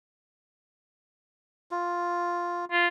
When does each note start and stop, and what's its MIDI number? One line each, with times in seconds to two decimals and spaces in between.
1.71 2.65 65
2.72 2.87 65